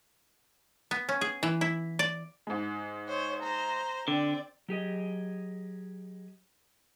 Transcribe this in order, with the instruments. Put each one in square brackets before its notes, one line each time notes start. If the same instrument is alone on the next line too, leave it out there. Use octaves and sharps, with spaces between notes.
[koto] B3
C#4
G#4
E3
E4
D5
[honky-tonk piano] G#2 G#3
[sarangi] C5 [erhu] C#5
[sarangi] C5 [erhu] A#5
[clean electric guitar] D3 [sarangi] C4 [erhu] D5
[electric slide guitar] F#3 G4 G#4 D#5